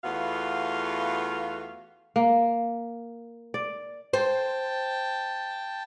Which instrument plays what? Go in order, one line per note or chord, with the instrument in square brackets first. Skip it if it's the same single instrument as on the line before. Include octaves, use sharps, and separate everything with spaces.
[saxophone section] E2 A3 B3 F4 F#4 F5
[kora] A#3
D5
[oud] C5 [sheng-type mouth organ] G5 A5